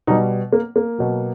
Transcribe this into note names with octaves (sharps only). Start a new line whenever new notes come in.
B2 G3 D#4
A#3
A#3
B2 F#3